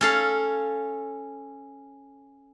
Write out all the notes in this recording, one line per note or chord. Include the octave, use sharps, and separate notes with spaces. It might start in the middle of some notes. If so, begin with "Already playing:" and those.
C#4 A4 F5